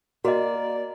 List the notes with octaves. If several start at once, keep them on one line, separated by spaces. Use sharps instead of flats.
A#3 F#4 D5 D#5